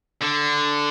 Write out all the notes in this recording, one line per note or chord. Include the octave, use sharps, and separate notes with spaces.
D3